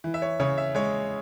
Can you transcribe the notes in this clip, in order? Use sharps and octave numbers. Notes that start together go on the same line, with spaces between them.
E3
E5
C#5
C#3 C#5
E5
G#3 C#5